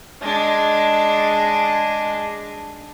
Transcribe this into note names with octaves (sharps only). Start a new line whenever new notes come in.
G#3 D4